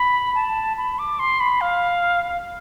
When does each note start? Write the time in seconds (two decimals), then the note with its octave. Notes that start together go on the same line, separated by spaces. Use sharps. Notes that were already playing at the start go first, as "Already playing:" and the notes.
Already playing: B5
0.35 A5
0.77 B5
0.99 D6
1.19 C6
1.40 B5
1.61 F5